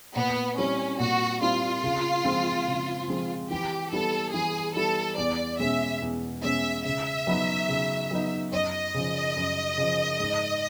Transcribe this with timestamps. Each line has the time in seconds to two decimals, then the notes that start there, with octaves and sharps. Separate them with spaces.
0.15 A#2 B3
0.58 G3 C4 C#4 E4
1.00 A#2 F#4
1.41 G3 C4 E4 F4
1.83 C#3
2.25 F3 G#3 C4
2.67 C#3
3.08 F3 G#3 C4
3.51 E3 G4
3.92 G3 B3 E4 A4
4.34 E3 G#4
4.75 G3 B3 E4 A4
5.18 E2 D5
5.59 B2 G#3 C#4 E5
6.02 E2
6.43 B2 G#3 C#4 E5
6.85 C#3 E5
7.27 F#3 B3 D#4
7.69 C#3
8.11 F#3 B3 D#4
8.52 F#2 D#5
8.94 C#3 F3
9.36 F#2
9.78 C#3 F3
10.20 G#2